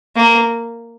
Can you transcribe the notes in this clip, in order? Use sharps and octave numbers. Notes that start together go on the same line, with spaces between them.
A#3